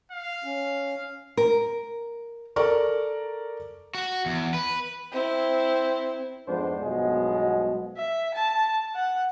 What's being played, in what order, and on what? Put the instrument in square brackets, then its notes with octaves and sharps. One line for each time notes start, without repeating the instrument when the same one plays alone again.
[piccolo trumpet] F5
[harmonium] C#4
[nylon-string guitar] A#4
[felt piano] A4 A#4 D5 C#6
[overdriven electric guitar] F#4
E2
B4
[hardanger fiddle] C4 E4
[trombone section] F2 G#2 G#3 B3 D4 C5
B1 G2 B2 F3 G#3
[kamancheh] E5
A5
F#5